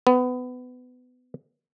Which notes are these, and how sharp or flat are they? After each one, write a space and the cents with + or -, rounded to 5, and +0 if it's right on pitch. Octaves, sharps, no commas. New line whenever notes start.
B3 +25